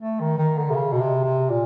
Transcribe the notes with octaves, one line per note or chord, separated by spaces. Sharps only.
A3
D#3
D#3
D3
C3
C#3
B2
C3
C3
A#2